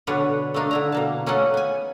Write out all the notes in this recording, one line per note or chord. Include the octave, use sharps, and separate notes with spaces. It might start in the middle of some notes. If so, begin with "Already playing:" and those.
B2 D3 D4 B4 C#5 F#5
A3 A#3 D4 D#4
D3 E4 A#5
B2 A#3 A5
A#3 C#4 D#4 A4 D#5 F#5
B3 G#5